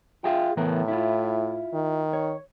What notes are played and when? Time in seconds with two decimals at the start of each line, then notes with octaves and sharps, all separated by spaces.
0.24 F4 G#4 E5 G5
0.57 A2 E3 B3 A#4
0.88 E4 F4
1.74 D#3
2.13 C#5